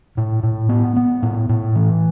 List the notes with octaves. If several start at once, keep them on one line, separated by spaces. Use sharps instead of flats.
A2
A2
B3
B3
A2
A2
E3